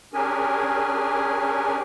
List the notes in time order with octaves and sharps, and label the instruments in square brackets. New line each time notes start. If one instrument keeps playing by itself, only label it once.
[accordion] C#4 D4 G4 G#4 A#4 G#5